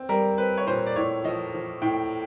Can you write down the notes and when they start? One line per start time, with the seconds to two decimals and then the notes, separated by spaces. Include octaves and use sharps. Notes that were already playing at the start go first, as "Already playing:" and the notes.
Already playing: C4
0.09 G3 A#4
0.38 C4 B4
0.58 C#5
0.67 A#2 C5
0.86 D5
0.96 A2 C#5
1.24 F3 D#5
1.54 F3
1.82 A2 G5